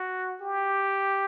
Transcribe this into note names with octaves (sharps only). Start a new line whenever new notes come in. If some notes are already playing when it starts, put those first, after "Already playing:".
Already playing: F#4
G4